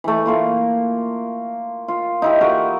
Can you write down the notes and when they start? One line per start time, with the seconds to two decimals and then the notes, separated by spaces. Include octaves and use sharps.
0.04 E3 A3
0.26 A#3 F4 A#4
1.88 F4
2.22 D#4 E4 G4
2.41 F#4 A#4 F#5